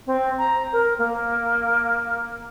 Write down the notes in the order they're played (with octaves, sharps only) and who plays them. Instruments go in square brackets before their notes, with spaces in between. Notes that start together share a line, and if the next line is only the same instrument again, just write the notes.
[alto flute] C4
A#5
A#4
A#3